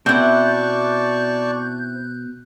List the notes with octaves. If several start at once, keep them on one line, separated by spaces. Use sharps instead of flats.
B2 C4 E4 D5 A5 C#6 F#6 G6